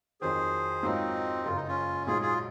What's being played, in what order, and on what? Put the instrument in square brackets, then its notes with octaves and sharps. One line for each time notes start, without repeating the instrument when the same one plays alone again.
[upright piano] F2 D#3 F#3 [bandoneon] G#4 C5
[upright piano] G#2 F#3 A#3 F4 [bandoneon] C4 D#4
[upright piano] F#1 F#2 C#3 [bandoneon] F4
[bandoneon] D#4
C#4 F4
[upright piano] A#1 G#2 F#3 [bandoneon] F4 G#4
[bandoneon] F4 G#4